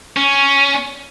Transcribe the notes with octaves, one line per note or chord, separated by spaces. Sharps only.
C#4